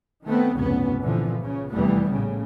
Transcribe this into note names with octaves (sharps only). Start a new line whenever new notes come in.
D#3 A3 B3 C4
F1 C#2 G2 B3 C#4
C2 A#2 D3 E3 F3
C#3 C#4
F1 E2 E3 G3 A3 B3
A#1 A2 C#3